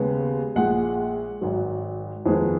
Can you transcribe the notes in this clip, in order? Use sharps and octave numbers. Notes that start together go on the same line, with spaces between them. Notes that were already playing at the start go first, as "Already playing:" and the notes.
Already playing: D#2 C#3 G#3 B3
A#1 A#2 G#3 F#5
G#1 G#2 F#3
F2 D#3 G#3 B3